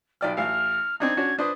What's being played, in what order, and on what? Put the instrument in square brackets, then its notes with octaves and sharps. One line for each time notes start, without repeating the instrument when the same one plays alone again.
[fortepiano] B1 D5 F6 [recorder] G5
[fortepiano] A1 F5 [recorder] F6
[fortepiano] C4 D4 D#4 [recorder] G#6
[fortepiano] C#4 D4 F#4
[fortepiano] D4 B4 C5 [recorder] D#6